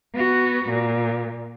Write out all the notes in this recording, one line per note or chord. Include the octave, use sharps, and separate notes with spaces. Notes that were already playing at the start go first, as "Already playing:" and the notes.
B3 F#4
A#2